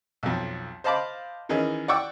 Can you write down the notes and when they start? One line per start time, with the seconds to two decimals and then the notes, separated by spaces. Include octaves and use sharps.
0.23 B1 F2
0.84 C5 D#5 F5 A5 B5 D6
1.49 D#3 E3 C#4 D#4 G#4
1.88 D5 F#5 G5 C#6 D6 E6